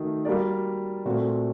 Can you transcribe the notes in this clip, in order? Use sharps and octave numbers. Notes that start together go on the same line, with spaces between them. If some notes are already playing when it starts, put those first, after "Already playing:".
Already playing: D#3 A3 D#4 F#4
G3 A#3 F#4 A#4 D5
A#2 A3 C4 F#4